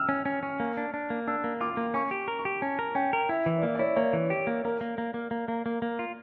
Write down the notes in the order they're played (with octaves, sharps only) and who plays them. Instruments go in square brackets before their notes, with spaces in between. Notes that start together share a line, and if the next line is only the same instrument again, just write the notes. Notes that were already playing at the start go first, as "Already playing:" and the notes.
Already playing: [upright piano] E6 F6
[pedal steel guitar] C#4
C#4
C#4
A#3
D4
D4
A#3
[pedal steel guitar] D4 [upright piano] E6
[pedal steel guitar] A#3
[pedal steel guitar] F4 [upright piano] D6
[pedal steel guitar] A#3
[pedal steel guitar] C#4 [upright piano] C#6
[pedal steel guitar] G4
A#4
[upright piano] C#6
[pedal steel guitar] G4
[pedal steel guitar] C#4 [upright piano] A5
[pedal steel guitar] A#4
[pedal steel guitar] C#4 [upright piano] G5
[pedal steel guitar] A#4
[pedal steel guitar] E4 [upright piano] E5
[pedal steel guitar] E3 [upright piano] E5
[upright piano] D5
[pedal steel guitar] A#3 [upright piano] E5
[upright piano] D5
[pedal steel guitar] E4 [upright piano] C#5
[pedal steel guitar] A#3 [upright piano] C#5
[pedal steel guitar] E3
G4
A#3
[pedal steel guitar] A#3 [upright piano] A#4
[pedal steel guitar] A#3
A#3
A#3
A#3
A#3
A#3
A#3
F4